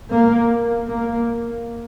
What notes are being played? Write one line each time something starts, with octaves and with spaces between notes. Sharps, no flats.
A#3
A#3